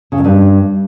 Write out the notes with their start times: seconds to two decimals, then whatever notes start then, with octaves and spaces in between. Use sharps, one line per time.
0.12 C#3
0.18 F2
0.25 G2